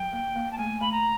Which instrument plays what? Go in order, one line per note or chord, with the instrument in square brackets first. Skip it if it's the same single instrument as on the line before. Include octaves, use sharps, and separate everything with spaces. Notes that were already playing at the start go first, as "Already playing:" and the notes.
Already playing: [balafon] F#3 [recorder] G5
[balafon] A#3
A#3
[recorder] A5
[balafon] A3 [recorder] G#5
[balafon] A3 [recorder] B5
[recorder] A#5